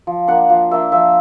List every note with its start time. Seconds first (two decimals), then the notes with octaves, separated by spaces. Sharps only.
0.07 F3
0.28 A#3 D4 F#5
0.50 F3 F5
0.71 A#3 D4 E5
0.92 F3 E5